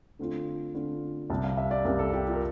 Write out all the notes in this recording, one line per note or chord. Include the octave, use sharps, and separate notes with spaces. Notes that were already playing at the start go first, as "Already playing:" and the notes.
D3 A3 C4 F4
D3 A3 C4 F4
C2 C3 G3 A5
F5
E5
D5
C2 C3 G3 A#4
A4
G4
F4
A#4